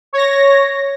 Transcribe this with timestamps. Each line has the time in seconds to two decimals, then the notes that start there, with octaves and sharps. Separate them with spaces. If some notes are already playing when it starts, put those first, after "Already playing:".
0.13 C#5 A#6